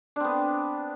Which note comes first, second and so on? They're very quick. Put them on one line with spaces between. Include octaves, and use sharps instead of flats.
D4 C4 B3